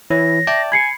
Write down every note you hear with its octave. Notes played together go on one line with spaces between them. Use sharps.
E3 E4 C#5 A#6
D5 E5 G5 A5
G#5 B5 G#6 C7 C#7